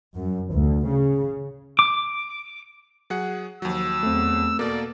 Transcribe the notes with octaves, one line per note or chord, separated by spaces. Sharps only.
F#2
D2
C#3
D6
F#3 G#4 F#5
D#2 F3 F#3 E6
E2 A3 C4
B2 A#3 A4 D5